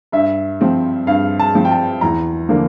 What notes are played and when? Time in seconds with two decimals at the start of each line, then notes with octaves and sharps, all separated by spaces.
0.12 G2 E5
0.61 F3 C4
1.07 G2 F5
1.39 A5
1.55 F3 C4
1.65 G5
1.71 A5
2.01 E2 A#5
2.49 D3 F3 A#3 D4